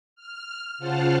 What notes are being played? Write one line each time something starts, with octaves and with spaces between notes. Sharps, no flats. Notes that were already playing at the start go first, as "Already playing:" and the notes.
F6
C#3 F4 C5 F#5 A5 F6